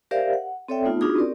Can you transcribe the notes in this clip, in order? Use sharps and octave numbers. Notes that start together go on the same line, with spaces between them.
G4 A#4 C5 D5 E5 F5
F#5
C4 A4 C#5 D5 E5 G5
A3 B3 D#4 F4
D4 D#4 F4 F#4 G#4 D#6
C4 C#4 G4 A#4 D5